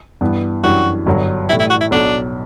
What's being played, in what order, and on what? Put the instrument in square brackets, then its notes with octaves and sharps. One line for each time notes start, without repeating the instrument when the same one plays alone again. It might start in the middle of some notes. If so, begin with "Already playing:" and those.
[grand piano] G2 E3 B3
[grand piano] F#2 E3 G3 D4 [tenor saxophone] F#4
[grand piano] G1 G2 F#3
[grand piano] A2 E3 G3 [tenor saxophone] E4
[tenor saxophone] E4
F#4
E4
[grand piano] B1 B2 F#3 [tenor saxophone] D4